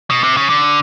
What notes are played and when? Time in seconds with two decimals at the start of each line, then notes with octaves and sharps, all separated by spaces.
0.10 B2
0.23 C3
0.37 C#3
0.50 D3